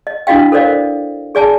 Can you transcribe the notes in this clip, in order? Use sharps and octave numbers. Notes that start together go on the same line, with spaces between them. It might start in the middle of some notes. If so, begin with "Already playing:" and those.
D#5
D4 E4 F#4 D#5 F5 G5
A4 A#4 C5 D5 D#5 F5
G#4 D5 G#5 A5